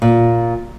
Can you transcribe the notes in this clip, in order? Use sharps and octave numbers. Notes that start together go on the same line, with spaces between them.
A#2